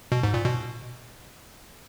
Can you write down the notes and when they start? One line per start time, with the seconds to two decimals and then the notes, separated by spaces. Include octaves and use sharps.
0.12 B2
0.23 G#2
0.34 A#2
0.46 B2